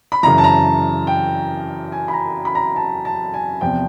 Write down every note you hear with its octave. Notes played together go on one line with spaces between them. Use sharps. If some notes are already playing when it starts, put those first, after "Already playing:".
B5
F#2 C#3 E3 A#5
A5
A#5
G5
G#5
B5
A#5
B5
A#5
A5
A5
G#5
E2 C3 F3 G5